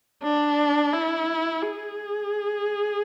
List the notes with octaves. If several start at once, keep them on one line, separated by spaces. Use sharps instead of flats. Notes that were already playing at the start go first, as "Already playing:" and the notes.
D4
E4
G#4